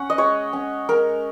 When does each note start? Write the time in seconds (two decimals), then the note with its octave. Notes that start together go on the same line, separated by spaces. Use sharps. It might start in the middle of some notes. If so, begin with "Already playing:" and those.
Already playing: C#4 F#5
0.10 D#5
0.18 G#3 C#5
0.53 C#4
0.89 G#3 A#4